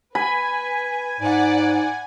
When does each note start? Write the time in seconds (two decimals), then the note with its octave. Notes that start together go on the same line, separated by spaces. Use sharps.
0.15 B4 G#5 B5
1.20 G#2 D5 F#5